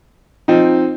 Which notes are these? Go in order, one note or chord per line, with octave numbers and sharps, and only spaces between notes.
F3 C4 D#4